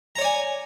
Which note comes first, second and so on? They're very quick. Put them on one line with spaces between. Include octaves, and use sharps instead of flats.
A#5 C#5 D5 G#5